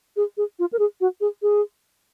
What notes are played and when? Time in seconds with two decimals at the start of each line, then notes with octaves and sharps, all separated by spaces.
0.16 G#4
0.37 G#4
0.59 F4
0.73 A#4
0.79 G#4
1.01 F#4
1.21 G#4
1.42 G#4